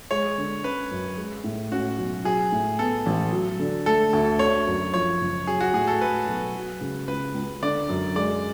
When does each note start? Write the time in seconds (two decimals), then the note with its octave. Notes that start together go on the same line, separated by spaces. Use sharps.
0.11 G#3 C#5
0.38 D3
0.64 C#4 B4
0.91 F#2
1.17 G#3
1.44 A2
1.72 C#4 F#4
1.98 B1
2.25 F#3 G#4
2.52 A2
2.79 B3 A4
3.06 A1
3.32 F#3
3.59 D3
3.86 A3 A4
4.13 D2
4.39 D3 C#5
4.67 F#2
4.94 F3 C#5
5.21 F#1
5.47 F#3 G#4
5.61 F#4
5.73 A2 G#4
5.88 A4
6.01 A3 B4
6.28 B1
6.55 F#3
6.81 C#3
7.08 C#2 B4
7.35 C#2
7.62 D3 D5
7.89 F#2
8.16 G#3 D5